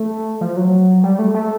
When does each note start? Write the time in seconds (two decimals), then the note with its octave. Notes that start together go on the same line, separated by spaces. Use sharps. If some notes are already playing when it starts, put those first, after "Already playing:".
Already playing: A3
0.41 F3
0.57 F#3
1.04 G3
1.19 A3
1.34 A3